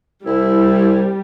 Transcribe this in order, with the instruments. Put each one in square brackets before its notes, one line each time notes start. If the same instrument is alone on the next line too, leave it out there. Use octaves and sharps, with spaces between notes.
[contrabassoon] C2 [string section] G3 [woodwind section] E4